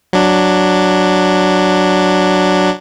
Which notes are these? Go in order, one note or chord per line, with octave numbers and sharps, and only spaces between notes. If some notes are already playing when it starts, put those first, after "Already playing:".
F#3 D4